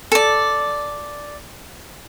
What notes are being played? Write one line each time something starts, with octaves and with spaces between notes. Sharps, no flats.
A4 D5